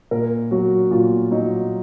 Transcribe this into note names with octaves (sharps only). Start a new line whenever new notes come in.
A#2 A#4
F#3 F#4
A#2 F4
F#3 D#4